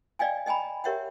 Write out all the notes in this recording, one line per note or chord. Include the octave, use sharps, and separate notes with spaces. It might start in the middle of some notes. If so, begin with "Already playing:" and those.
D5 D#5 F5 G5 G#5
D#5 G5 G#5 A#5 B5
G4 A#4 C#5 E5 F#5 G5